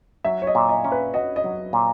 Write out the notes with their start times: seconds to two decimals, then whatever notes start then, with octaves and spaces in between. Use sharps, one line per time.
0.25 F#3 E5
0.42 C#5
0.47 D#5
0.55 A#2
0.69 D#5
0.84 C#4
0.92 B4
1.14 F#4 D#5
1.36 D#5
1.44 F#3
1.73 A#2